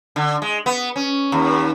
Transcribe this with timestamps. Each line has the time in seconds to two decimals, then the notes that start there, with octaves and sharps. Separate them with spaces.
0.16 D3
0.42 G#3
0.66 B3
0.96 C#4
1.32 D#2